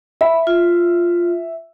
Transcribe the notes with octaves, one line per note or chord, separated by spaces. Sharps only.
E5 B5
F4